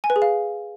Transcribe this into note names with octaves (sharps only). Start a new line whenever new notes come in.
G#5
B4
G#4
F5